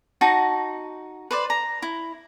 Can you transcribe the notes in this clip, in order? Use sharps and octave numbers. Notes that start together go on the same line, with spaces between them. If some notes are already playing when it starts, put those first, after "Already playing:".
D#4 F#4 A5
B4 C5 D5
A#5
E4